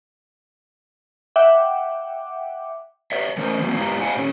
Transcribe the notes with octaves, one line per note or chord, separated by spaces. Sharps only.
E5 F#5 G5 D6
B4 C#5 E5
E3 A3 C#4 A#4 C5
E3 F#3 A#3 C4
G#2 B3 E4 G4 F5 A#5
G4 C5 F5 F#5 G#5
A#2 C#4